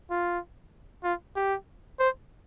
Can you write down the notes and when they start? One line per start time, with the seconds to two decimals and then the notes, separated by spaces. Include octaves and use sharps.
0.10 F4
1.04 F4
1.36 G4
1.99 C5